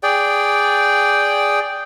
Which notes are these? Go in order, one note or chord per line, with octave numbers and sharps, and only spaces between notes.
G#4 D5 G5